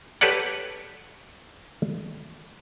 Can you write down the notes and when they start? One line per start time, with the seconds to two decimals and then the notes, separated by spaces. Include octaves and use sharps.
0.21 G4 A4 B4 C#5 D5 F#5